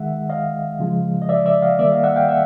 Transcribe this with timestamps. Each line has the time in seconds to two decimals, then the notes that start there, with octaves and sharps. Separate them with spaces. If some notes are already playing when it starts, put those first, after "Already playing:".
Already playing: D#3 G#3 E5 F#5
0.30 D#5 F5
0.79 C#3 F3 G#3
1.22 D#5
1.29 D5 E5
1.46 D5 E5
1.62 D#5 F5
1.79 D#3 G3 A#3 D5 E5
1.91 D#5 F5
2.04 E5 F#5
2.16 F5 G5
2.29 E5 F#5